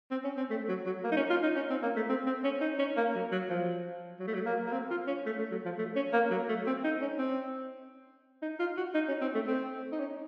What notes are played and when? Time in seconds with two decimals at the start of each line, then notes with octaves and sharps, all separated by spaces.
0.11 C4
0.24 C#4
0.37 C4
0.50 A3
0.69 F#3
0.86 F#3
1.04 A#3
1.12 D#4
1.17 C#4
1.31 F4
1.43 D#4
1.56 C#4
1.70 C4
1.82 A#3
1.96 A3
2.09 C4
2.27 C4
2.44 C#4
2.61 D#4
2.79 C#4
2.97 A#3
3.15 F#3
3.32 F#3
3.49 F3
4.20 F#3
4.28 A3
4.34 F#3
4.46 A#3
4.67 A#3
4.72 C4
4.91 F4
5.07 C#4
5.26 A3
5.39 A3
5.51 F#3
5.65 F3
5.79 A3
5.96 C#4
6.13 A#3
6.31 F#3
6.49 A3
6.67 C4
6.84 D#4
7.02 C#4
7.19 C4
8.42 D#4
8.60 F4
8.77 F#4
8.95 D#4
9.08 C#4
9.21 C4
9.34 A3
9.48 C4
9.92 D#4
10.00 C#4